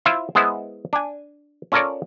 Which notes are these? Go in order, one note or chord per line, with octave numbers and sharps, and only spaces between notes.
E4 F4 C5 E5 F5
G#3 B3 E4 C5
D4 G#5
C#4 F4 A4 A#4 C#5 D5